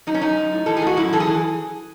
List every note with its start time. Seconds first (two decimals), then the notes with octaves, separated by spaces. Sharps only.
0.07 F#2 D#4
0.14 C#4
0.21 F#2 D#4
0.37 F#2
0.52 A2
0.66 E3 A4
0.77 G#4
0.82 A2 F#4
0.97 F#2 E4
1.13 E3 A4
1.20 G#4
1.27 E3